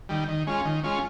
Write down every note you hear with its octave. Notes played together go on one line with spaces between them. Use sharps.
D#3 G3
D#3
G#3 C#4 F4
D#3
G#3 C#4 F4